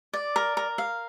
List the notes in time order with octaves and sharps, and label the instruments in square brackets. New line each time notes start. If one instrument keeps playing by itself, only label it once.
[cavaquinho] D5
A#4
A#4
F5